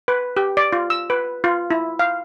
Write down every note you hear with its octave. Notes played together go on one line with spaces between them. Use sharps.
B4
G4
D5
F4
E6
B4
F4
E4
F5